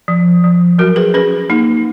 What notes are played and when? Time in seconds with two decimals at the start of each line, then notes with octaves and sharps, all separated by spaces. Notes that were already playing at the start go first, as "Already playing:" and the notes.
0.08 F3
0.44 F3
0.78 F#3 F#4 A#4
0.96 G#4 B4
1.14 C#4 G#4 B4
1.49 A#3 D#4